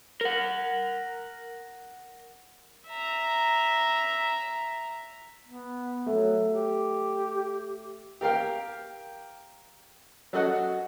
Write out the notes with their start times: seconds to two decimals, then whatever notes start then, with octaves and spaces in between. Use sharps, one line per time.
0.21 A#4 F#5
2.88 E5 A#5
5.46 B3
6.06 F#3 A3
6.52 G4
8.21 G4 A#4 F5 G5
10.33 F#3 F#4 A4 D#5 F#5